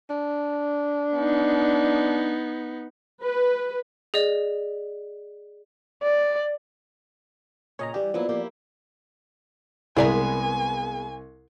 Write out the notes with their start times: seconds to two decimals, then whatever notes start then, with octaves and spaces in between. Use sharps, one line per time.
0.10 D4
1.15 B3 D#4
3.22 B4
4.14 G#4 D5 D#5
6.03 D5
7.79 A#2 C#3 C#5 D#5 A#5
7.94 E3 G3 G4 D5
8.14 F3 F#3 A#3 B3 E4
8.29 A#3 E4 G4
9.97 C2 G#3 B3 E4 G#4 A#4 D5 G#5